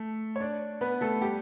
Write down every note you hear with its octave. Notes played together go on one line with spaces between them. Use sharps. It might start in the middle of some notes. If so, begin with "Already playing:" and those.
Already playing: A3
C#5
D4 D5
B3 B4
A3 A4
G3 G4